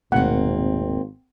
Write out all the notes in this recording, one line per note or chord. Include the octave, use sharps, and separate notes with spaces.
D#1 G#1 B2 A3 A#3 C4 F#5